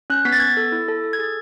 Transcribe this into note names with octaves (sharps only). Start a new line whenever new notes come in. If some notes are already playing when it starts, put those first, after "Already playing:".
C#4 F#6
B3 B6
A6
B3 G#6
A6
A4
E4
A4
A4
G#6
G#4 A6